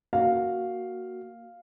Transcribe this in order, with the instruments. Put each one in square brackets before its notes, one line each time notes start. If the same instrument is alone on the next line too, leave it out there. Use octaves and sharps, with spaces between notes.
[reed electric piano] A#3 F#4 [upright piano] F5